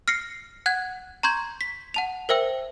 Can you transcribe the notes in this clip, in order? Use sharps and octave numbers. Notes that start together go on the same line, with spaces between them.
F6 A#6 C7 C#7
F#5 F#6 G#6
A#5 C6 C#6 G6 G#6
B6
F#5 A5 F7
A#4 C5 E5 G5 E6